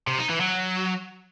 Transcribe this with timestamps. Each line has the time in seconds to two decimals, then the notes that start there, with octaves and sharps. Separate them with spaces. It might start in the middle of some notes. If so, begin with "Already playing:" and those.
0.07 C3
0.18 D#4
0.30 E3
0.41 F#3